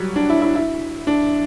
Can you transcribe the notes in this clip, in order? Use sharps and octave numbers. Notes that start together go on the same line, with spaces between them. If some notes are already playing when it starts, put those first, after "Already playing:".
Already playing: F#3 G3
D4
E4
E4
E4
D4